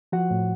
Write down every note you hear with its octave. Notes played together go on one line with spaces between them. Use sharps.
F3 F#4 F#5
A2